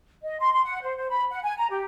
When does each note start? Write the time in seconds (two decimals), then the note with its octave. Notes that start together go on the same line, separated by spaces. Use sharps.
0.23 D#5
0.40 C6
0.53 C6
0.65 F#5
0.83 C5
0.97 C5
1.10 B5
1.30 F#5
1.43 G#5
1.57 A#5
1.70 G4